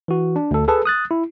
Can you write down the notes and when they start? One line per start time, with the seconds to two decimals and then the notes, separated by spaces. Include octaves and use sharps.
0.08 E3 F#4
0.36 D4
0.51 D2 A4
0.68 G#4 A4 B4 A5
0.85 D#6 F#6 A6
1.11 E4